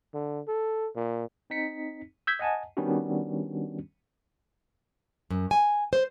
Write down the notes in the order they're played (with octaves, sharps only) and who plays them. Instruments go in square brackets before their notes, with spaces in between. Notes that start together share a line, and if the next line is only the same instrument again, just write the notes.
[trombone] D3
A4
A#2
[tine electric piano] C4 D#4 B6 C#7
E6 G6 G#6 B6
D#5 F#5 G#5 A5
D#3 G3 B3 C#4 D4 F#4
[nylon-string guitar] F#2
G#5
C5